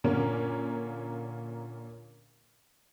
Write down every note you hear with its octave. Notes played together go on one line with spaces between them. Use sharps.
A#2 D3 A#3 C#4